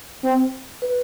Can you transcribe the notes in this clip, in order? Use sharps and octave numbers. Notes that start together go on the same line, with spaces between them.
C4
B4